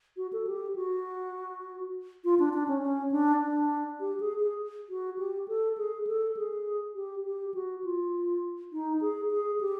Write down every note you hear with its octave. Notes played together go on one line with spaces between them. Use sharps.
F#4
A4
G4
F#4
F4
D4
D4
C#4
C#4
D4
D4
G4
G#4
G#4
F#4
G4
A4
G#4
A4
G#4
G4
G4
F#4
F4
D#4
G#4
G#4
G4